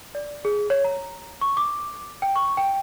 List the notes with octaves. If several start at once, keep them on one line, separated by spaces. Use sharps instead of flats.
D5
G#4
C#5
A#5
C#6
D6
G5
C#6
G5